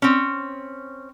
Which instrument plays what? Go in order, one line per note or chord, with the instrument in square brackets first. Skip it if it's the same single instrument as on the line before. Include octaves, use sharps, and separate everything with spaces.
[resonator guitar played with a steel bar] C4 C#4